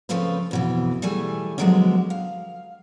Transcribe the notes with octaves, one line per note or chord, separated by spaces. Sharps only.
C#3 F3 A3 C4 F4 B4
F2 B2 E3
E3 G3 A3 G#4 G#5
D3 F3 F#3 G#3 B3 C#4
F5